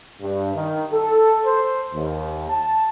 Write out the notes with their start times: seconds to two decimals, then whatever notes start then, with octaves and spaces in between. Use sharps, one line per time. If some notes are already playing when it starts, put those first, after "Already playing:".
0.21 G2
0.55 D#3
0.93 A4
1.46 C5
1.93 D#2
2.50 A5